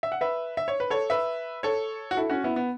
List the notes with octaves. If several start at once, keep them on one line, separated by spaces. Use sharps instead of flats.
E5
F#5
B4 E5
E5
C#5
B4
A4 C#5
B4 E5
A4 C#5
F#4
E4 A4
C#4 F#4
B3 E4
B3